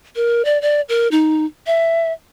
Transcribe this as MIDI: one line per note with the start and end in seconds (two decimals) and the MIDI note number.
0.16 0.42 70
0.45 0.60 74
0.62 0.81 74
0.89 1.08 70
1.11 1.45 63
1.67 2.13 76